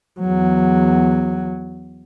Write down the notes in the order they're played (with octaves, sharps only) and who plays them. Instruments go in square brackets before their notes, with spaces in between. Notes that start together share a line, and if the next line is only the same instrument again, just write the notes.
[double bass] E2 F#3